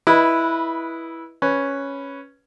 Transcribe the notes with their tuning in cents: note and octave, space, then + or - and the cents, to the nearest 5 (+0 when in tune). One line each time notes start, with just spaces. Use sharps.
E4 +0 B4 -20 D#5 +0
C#4 +0 B4 +0